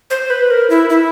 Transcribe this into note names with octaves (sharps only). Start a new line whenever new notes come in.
C5
B4
A#4
E4
E4